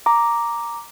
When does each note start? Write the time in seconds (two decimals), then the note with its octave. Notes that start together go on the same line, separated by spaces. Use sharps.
0.06 A#5 D6